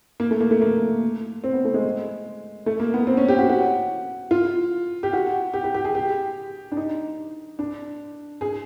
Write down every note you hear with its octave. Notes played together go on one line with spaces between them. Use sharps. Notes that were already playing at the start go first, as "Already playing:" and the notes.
A#3
A3
A#3
A3
A#3
C4
B3
A3
G#3
A3
A#3
B3
C4
C#4
G4
F#4
F#4
F4
G4
F#4
G4
G4
G4
G#4
G4
D4
D#4
D4
G#4